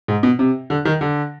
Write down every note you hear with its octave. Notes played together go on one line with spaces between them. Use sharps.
G#2
B2
C3
D3
D#3
D3